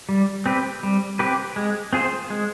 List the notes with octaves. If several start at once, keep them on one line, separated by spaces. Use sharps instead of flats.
G3
C4 G4 B4
G3
C4 G4 B4
G#3
C4 F4 G#4 C5
G#3